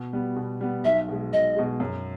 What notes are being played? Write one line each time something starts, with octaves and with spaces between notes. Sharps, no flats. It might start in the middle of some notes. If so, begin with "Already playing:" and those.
Already playing: B2
G3 B3
B2
G3 B3
B1 E5
B2 G#3
B1 D#5
B2 G#3
F#2